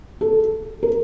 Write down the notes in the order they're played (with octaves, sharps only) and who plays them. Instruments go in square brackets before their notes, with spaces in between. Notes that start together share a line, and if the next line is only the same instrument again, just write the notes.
[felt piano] A4
A#4